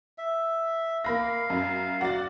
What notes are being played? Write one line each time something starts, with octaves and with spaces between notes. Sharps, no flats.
E5
A#3 F5 B5 A#6
F#2
F#4 D5 A6